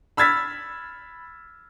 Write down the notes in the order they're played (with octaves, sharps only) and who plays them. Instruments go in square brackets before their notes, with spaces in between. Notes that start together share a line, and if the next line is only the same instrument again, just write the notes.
[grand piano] B5 E6 F6 G#6 A6 B6